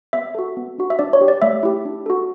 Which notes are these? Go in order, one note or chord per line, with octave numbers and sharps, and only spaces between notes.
B3 E5
F#4 A4
B3
D4 F#4
E5
D4 D5
C#5
G4
D5
A3 E5
E4 G4
D4
F#4 A4